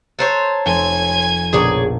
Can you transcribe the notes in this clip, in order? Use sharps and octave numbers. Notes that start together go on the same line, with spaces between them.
A4 C5 C#5 A#5 C#6 F#6
F1 G#5 G#6
A#1 B2 G#4 A#4 C#5 D5